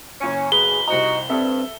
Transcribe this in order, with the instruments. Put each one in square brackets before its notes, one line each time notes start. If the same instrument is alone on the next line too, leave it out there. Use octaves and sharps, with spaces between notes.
[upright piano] F#1 C#7 [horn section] C#4 [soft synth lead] G#5
[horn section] B2 B4 [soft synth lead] G#4 [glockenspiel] G7
[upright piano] C2 C5 A#5 [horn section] D#4 F#4 [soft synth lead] D#5
[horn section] G2 [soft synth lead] C4 [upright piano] A4 E5